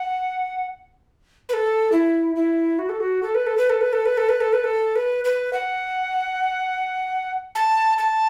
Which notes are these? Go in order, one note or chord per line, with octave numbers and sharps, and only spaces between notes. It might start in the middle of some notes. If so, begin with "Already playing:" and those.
Already playing: F#5
B4
A4
E4
E4
F#4
A4
F#4
A4
B4
A4
B4
A4
B4
A4
B4
A4
B4
A4
B4
A4
B4
B4
F#5
A5
A5